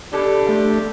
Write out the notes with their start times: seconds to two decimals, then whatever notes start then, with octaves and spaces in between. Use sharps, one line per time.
0.13 B2 D4 G4 A4
0.49 F3 A3